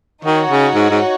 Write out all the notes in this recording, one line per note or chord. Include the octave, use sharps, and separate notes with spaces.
D#3 D#4 F#4 C#5
C#3
G#2
G#2